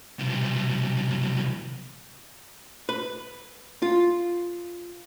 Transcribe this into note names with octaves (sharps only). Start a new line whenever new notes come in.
C2 B2
B4
F4